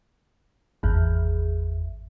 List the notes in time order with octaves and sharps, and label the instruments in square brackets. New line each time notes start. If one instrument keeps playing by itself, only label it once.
[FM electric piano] G#1 E2